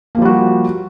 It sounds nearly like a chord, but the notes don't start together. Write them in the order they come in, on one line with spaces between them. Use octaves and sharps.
A#3 F3 G3 F#4